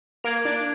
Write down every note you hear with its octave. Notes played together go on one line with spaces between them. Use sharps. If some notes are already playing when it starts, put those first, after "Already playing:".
A#3 G#6 D7 F7
D4